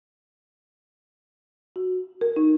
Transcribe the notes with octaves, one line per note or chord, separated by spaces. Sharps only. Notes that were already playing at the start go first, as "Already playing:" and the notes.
F#4
A#4
D#4